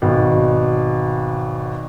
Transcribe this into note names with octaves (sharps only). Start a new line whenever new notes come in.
G#1 B2